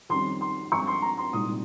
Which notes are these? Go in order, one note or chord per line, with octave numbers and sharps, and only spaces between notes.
F2 D#3 G3 C#4 C6
C6
G2 F3 G#3 C4 C#6
C6
A#5
C6
C2 A#2 G#3 C4 D#4 D#6